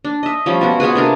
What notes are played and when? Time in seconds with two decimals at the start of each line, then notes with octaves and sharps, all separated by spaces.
0.05 D4
0.23 D#5 E5
0.46 F3 G3 A3 C#4
0.61 B2 F#4
0.80 B3 F4 G#4 B4
0.95 C3 D4 A#4